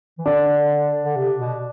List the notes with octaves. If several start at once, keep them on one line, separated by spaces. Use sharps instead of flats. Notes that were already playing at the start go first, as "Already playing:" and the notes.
E3
D3 D4
D3
C3
B2